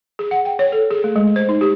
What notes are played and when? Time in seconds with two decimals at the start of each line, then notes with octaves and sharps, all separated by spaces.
0.19 G#4
0.31 F#5
0.45 G5
0.59 C#5
0.72 A4
0.91 G#4
1.04 A3
1.16 G#3
1.36 C5
1.49 D#4
1.61 G4